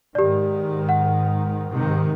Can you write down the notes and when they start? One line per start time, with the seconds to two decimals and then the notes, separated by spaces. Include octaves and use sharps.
0.15 G#2 D#3 G4 D5
0.89 F#5
1.71 G#2 C3 D#3